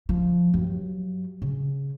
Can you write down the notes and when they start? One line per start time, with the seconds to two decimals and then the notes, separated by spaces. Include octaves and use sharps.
0.09 F3
0.54 G2 F#3
1.42 C#3